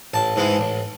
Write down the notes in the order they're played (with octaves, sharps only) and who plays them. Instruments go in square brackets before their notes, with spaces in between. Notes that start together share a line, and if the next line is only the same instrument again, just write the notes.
[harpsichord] A1 A5
G#2 E3 G#3
A1